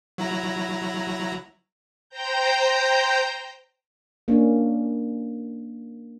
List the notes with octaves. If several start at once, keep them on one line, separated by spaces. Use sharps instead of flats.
F#3 E4 A#5
C5 G5 A#5 G6
A#3 C#4 D4